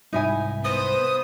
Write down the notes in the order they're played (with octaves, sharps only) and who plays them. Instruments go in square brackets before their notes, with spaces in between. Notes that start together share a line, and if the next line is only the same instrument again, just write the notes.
[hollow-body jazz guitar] C2 G#2 [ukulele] D#4 E4 G#5
[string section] B3 B4 C5 [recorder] D#6